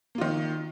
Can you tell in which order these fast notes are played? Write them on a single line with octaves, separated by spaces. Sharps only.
A#3 F4 D#3